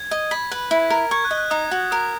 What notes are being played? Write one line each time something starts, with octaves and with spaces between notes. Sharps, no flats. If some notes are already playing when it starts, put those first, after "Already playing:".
Already playing: G#6
D#5
B5 B6
B4
E4
A#4
C#6 G#6
F#6
D#5
F#6
D#4 D#6
F#4
A#4 D#6